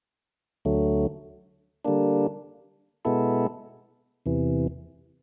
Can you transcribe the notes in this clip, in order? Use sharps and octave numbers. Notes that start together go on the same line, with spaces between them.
D2 D3 F#3 A3
D3 G3 A#3 D4
B2 G#3 B3 E4 A4
E2 C3 E3